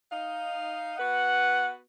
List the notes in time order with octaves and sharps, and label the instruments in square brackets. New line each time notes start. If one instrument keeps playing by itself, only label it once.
[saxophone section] D#4 F5
[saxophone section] B3 F#4 B4 [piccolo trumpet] F#5